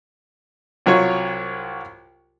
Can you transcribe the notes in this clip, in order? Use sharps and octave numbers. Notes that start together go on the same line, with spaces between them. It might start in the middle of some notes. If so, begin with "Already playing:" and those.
C2 F#3 F4 C#5